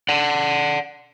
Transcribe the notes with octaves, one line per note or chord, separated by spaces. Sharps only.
D5 F#5